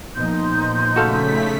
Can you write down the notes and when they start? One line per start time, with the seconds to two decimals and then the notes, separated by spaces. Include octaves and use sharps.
0.16 A#2 F3 B3 D#4 C6 G6
0.96 C#3 A3 F#4 A4 F5 B6